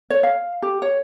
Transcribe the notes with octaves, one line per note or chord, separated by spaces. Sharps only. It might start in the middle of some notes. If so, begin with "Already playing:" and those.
C#5
F5
G4
C#5